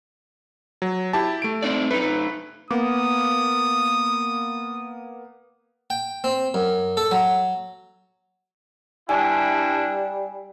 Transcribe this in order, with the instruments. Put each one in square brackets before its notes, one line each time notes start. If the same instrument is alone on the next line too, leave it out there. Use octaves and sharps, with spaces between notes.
[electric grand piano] F#3
E4 G4 A5
A3 D7
[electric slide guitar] C4 D#4 D5
[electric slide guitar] A3 D#4 [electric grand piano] B4
[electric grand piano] A#3 B3 D6 [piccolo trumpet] D#6
[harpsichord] G5
C4
F#2
A4
F#3
[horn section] G2 D4 E4 [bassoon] G3 [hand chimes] G#5